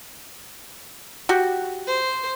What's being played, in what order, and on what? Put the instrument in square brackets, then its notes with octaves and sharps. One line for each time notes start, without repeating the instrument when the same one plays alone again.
[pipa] F#4 G4
[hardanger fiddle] C5